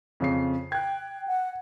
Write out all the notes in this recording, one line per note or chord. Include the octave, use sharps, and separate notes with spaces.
F2 C#3 C7
G5 F#6 G#6
F#5